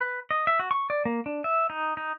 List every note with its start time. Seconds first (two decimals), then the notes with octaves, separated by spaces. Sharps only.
0.01 B4
0.31 D#5
0.47 E5
0.59 F#4
0.71 C#6
0.90 D5
1.05 A#3
1.26 D4
1.44 E5
1.70 D#4
1.97 D#4